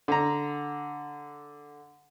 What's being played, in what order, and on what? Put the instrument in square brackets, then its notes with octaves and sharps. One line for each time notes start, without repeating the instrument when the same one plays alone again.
[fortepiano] D3 A#5